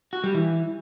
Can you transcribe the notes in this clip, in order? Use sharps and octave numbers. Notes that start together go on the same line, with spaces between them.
F#4
G3
E3